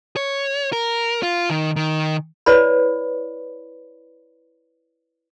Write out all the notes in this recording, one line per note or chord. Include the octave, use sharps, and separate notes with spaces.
C#5
A#4
F4
D#3
D#3
E4 B4 C#5 D5 B5